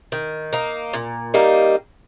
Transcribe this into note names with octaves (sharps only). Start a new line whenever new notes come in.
D#3
A#3 D#4
A#2
G3 A#3 D#4